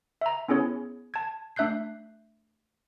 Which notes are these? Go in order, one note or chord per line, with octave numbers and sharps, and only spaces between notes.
E5 A#5
B3 C#4 E4 G#4 C#5
A5 G#6
A3 D4 E5 F#6 G6 C7